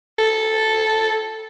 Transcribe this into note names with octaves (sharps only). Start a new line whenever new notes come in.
A4